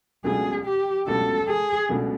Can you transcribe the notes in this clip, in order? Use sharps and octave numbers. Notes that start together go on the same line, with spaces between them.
C#2 B2 F#3 A3 D4 G#4
G4
C#2 B2 F#3 A3 D4 A4
G#4
C#2 B2 F#3 A3 D4